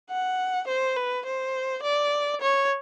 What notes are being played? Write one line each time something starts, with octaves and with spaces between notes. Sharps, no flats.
F#5
C5
B4
C5
D5
C#5